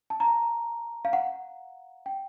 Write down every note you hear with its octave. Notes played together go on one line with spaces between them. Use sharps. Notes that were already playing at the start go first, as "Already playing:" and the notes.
A5
A#5
F5
F#5
G5